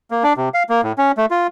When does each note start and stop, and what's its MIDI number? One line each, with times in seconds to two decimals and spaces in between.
0.11 0.23 58
0.24 0.33 62
0.37 0.49 48
0.54 0.63 77
0.69 0.81 58
0.83 0.92 45
0.98 1.12 61
1.17 1.26 57
1.31 1.47 65